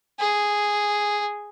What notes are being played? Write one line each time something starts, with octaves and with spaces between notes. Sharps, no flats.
G#4